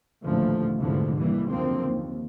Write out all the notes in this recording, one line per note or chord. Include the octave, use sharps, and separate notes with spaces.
A1 D#2 A#2 D3 F3 A3
F1 D2 G#2 D3 E3 F3
D#2 E3 G3
F#1 D#2 D3 F3 A#3 C4
D#2